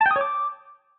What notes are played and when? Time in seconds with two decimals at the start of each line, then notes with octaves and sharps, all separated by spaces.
0.01 A5
0.06 G5
0.11 D#6
0.16 C#5
0.21 D6